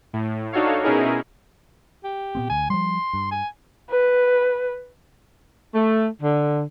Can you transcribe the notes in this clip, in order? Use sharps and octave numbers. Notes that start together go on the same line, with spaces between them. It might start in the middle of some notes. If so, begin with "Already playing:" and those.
A2
D4 D#4 F#4 A4 C#5 F5
B2 C#4 D#4 E4 G#4 A#4
G4
A#2 B3 C4
D2 G#5
F3 G3 C6
G2
G#5
B4
A3
D3